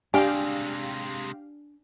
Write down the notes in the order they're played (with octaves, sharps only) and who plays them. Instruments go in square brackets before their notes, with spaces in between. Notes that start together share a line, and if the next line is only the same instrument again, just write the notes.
[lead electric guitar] C3 G#3 [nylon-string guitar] D4 [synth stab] G4 F5 G5 [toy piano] G#5